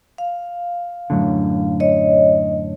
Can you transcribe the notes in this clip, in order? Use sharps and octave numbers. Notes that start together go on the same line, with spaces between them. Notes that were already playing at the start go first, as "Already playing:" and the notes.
F5
F#2 A2 D3
C#5 D#5